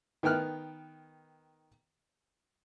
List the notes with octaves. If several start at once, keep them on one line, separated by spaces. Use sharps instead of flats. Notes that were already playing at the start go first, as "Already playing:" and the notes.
D#3 B3 G5 F6 F#6